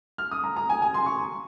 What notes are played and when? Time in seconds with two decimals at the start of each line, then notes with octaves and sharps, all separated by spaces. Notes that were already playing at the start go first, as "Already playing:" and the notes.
0.18 F6
0.31 D#6
0.44 A#5
0.56 A#5
0.69 G#5
0.82 G#5
0.94 C6
1.06 C#6